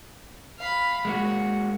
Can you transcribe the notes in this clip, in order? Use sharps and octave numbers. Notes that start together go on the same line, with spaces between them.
F5 B5
G#3 A#3 F#4 F#5